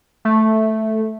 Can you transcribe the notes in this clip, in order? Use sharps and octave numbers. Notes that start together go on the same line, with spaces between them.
A3